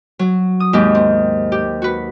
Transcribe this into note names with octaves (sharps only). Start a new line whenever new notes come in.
F#3
D#6
D#2 G#2 G4
C4
G4
F#4 B4